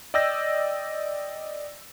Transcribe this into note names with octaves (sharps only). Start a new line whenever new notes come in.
D5 D#5 G5 E6 G6 A#6